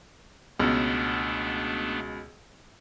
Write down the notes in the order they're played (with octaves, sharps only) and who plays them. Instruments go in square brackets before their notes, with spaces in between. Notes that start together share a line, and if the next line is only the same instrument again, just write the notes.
[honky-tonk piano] C#2 B2 [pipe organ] A3 B3 D4